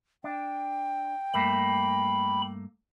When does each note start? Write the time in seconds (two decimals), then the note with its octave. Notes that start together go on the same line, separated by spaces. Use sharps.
0.24 D4 G5
1.34 G2 A3 A#3 B5